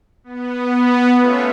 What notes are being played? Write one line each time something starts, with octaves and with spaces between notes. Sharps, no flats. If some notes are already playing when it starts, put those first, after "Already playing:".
B3
A3 C#4 F4 B4 C#5 E5